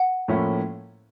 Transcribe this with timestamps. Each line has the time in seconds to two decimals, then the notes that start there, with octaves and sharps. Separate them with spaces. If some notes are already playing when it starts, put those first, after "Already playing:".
Already playing: F#5
0.28 A2 F3 A#3 C#4 E4